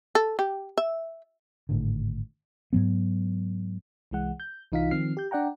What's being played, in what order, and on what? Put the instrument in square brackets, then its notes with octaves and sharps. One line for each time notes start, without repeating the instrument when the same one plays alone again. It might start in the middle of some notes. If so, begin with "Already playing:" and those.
[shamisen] A4
G4
E5
[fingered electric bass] G#1 A2 D3
[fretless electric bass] G#2 F#3 B3
[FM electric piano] C2 E3 G#3 F#5
G6
C2 E3 D#4 F4 F5 B6
D#3 F3 C4 F6 C7
G4 G6
D4 D5 F#5 G5 A#5